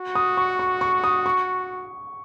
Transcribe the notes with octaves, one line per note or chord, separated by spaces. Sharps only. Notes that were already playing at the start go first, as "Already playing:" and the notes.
Already playing: F#4
D#6
C#6
C#6
C#6
D#6
C#6